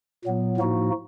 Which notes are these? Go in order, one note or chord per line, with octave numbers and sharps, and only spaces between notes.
A#2 F#3 B3
A2 F3 A#3 D#4 F#4